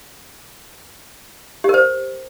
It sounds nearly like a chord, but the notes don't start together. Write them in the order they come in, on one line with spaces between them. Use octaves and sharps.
G4 A#4 C5